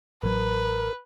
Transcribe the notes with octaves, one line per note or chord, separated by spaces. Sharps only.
A1 F#3 A#4 B4